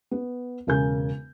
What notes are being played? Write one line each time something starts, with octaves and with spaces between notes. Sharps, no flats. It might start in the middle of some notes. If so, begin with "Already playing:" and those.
B3
E1 C#3 A#4 G#5 G6